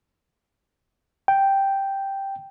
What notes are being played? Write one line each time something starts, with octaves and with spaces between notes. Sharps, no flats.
G5